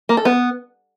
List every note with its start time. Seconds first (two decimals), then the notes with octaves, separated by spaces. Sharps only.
0.09 A#3
0.17 A4
0.25 B3